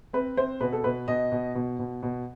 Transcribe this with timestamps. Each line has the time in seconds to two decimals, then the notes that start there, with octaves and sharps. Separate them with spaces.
0.13 C4 B4
0.37 C4 C5
0.61 B2 B4
0.73 A4
0.84 B2 B4
1.08 B2 D#5
1.32 B2
1.55 B2
1.79 B2
2.03 B2